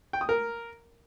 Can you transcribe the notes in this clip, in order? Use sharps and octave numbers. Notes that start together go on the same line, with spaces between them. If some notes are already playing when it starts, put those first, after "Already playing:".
G5
D#6
A#4